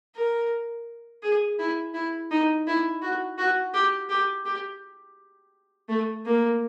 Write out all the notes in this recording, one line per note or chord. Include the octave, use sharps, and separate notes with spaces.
A#4
G#4
E4
E4
D#4
E4
F#4
F#4
G4
G4
G4
A3
A#3